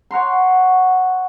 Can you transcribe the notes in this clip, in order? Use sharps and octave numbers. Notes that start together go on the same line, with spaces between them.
C#5 F#5 A#5 C6